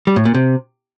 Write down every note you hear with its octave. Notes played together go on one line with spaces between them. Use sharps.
G3
A2
A#2
C3